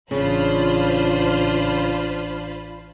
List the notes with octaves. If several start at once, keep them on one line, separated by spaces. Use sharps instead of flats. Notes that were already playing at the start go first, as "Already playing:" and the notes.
A1 C#3 D4 F4 C5 B5